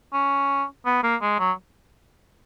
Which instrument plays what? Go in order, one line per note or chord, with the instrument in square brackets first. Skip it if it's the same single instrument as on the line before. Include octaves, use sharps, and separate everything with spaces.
[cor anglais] C#4
B3
A#3
G#3
F#3